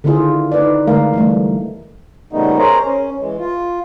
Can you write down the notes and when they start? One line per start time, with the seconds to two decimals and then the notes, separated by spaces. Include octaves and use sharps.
0.04 D3 D#3 C4 E4 F4 G#4
0.52 D#4 B4 D5
0.87 D3 G#3 A3 A#4 F5
1.13 E3 G3 A3
2.33 A#2 C#3 G3 A3 B3 D#4
2.58 G#4 A#4 C5 C#5 A#5
2.86 C#4
3.20 E3 G#3
3.39 F4